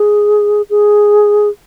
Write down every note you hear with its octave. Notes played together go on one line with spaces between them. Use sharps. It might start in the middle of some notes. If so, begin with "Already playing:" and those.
Already playing: G#4
G#4